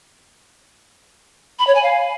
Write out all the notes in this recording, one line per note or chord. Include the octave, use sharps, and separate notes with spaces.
B5
C#5
G#5
F5